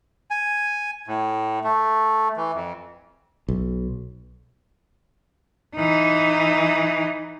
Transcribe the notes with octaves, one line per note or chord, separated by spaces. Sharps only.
G#5
A2
A3
E3
F2
B1
E3 D#4